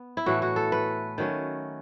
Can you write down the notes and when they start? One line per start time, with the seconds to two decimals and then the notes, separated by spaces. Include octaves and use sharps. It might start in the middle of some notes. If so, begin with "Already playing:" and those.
Already playing: B3
0.17 E4
0.26 A2 E3 A3 F#4
0.42 F#4
0.56 A4
0.72 B4
1.18 D#3 F#3 A3 C#4